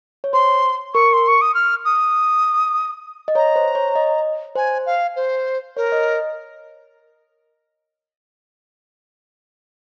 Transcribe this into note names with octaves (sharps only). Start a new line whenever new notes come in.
C#5
C5 C6
A#4 C#6
C6
C#6
D#6
F6
D#6
D#5
C#5 A#5
C5
C#5
D#5
C5 G#5
F5
C5
A#4 C#5
D#5